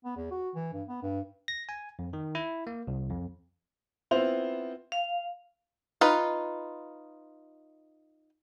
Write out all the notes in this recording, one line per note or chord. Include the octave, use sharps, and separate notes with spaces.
B3
E2
F#4
E3
G2
B3
G2
A#6
G#5
F2
D#3
E4
A#3
C2
F2
B3 C4 E4 F4 C5 F7
F5
D#4 F4 B4